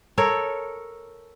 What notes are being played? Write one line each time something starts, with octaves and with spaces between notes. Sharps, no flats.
A4 A#4 C#5